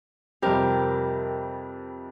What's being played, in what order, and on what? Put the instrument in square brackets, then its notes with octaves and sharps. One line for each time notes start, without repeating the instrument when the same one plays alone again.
[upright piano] F2 C3 G3 C4 [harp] G4 A#4